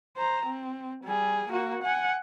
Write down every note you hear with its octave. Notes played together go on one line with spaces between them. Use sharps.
C5 A#5
C4
G3 G#4
A#3 F#4
F#5 G#5